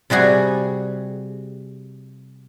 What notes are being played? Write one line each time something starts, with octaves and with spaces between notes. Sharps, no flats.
C3 G3 F#4 G#4